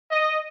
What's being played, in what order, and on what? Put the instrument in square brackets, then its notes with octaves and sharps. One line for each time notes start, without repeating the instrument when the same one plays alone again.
[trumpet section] D#5